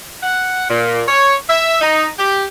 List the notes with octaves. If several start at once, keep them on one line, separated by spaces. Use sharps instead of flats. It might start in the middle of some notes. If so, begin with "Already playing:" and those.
F#5
A#2
C#5
E5
D#4
G4